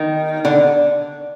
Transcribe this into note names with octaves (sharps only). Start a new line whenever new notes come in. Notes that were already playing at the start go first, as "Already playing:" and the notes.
Already playing: D#3
D3